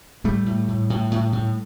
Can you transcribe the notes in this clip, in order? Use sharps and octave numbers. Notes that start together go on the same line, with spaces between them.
A2 G3 A3
A2
A2
A2
A2
A2